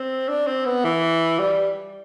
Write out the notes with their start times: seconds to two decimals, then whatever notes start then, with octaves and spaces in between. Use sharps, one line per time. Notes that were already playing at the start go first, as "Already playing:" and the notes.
Already playing: C4
0.29 D4
0.47 C4
0.66 B3
0.84 E3
1.40 G3